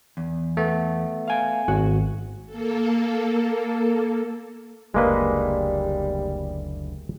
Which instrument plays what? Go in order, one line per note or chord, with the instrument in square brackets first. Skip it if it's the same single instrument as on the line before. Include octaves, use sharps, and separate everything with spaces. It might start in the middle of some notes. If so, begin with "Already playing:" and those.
[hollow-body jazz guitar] E2
[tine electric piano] A3 B3
[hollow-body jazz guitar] F5 G#5
[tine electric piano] G#1 [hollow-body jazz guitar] F#4
[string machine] A#3 A4
[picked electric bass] F#1 D2 [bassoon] G3 [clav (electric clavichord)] G#3 A#3 B4